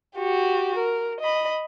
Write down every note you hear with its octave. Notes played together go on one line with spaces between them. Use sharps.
F#4 G4
A#4
D#5 B5